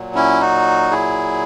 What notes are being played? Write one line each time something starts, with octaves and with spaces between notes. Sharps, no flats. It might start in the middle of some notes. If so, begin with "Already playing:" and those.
Already playing: A#2 F#3
C#4 E4
D#4 F#4
E4 G#4